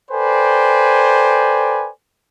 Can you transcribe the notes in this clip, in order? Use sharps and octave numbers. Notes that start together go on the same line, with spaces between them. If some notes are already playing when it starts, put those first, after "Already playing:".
A4 B4 C5 D5 G5 G#5